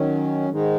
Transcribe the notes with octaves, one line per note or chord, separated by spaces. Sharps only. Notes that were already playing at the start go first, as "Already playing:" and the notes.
Already playing: D#3 F#3 C#4
G#2 D#3 G#3 D#4